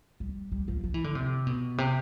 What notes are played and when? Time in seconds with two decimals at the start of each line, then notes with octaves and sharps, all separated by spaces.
0.20 G3
0.52 G3
0.68 F3
0.84 F3
0.94 E3
1.04 D3
1.15 C3
1.47 B2
1.78 C3